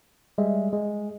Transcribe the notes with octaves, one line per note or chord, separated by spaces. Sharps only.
G3 G#3 E5
G#3